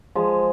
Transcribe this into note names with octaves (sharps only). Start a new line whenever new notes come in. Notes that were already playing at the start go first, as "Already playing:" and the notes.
F3 G#3